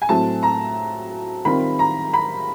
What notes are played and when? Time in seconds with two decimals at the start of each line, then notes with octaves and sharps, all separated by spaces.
0.02 G#5
0.09 A2 F#3 A3 C4 A5
0.43 A#5
1.45 D#3 G3 C4 F4 B5
1.79 A#5
2.13 B5